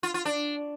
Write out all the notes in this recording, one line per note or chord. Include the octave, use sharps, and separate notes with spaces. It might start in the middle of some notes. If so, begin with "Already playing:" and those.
F4
F4
D4